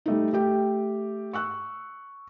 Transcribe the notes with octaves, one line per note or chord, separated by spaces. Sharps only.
G3 A3 D#4
A3 G4 G5
C#6 E6 F#6